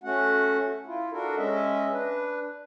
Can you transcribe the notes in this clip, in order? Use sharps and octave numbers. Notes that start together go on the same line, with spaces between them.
A3 C#4 F#4 F#5
E4 F4
D4 F#4 A4 A#4
G#3 C#4 D#5 E5
D4 B4